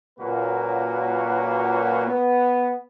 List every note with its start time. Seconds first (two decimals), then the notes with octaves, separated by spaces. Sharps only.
0.19 C#2 A#2 F#3 A#3 F#4 B4
2.07 B3